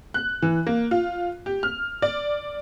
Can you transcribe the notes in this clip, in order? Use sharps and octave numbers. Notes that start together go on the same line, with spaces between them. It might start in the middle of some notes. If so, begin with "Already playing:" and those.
F#6
E3
A#3
F4
G4
F6
D5